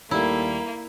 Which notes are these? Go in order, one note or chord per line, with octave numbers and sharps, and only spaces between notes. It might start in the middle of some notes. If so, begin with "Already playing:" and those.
D#2 G3 A3 A#3 E4